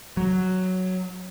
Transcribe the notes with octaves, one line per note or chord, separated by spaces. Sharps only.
F#3